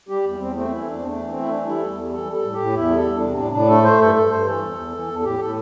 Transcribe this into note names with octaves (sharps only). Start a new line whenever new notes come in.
G3 G4
E2
E2 C4
A3 C4
E3 E4
E2 D4
C4
A3 D4
E3
C4
A3
E4
E3 D4
G3 E4
E2 A4
G3
E3 A4
G3
A4
A2
G4
A2
E2 E4
G3 A4
E2
D4
C3
A2 D4
A2 D4
A3 A4
A3 C5
G2 A4
G2 A4
G2 C5
E3 A4
E2
E2
E3
E2
A4
A2 G4
A2 A4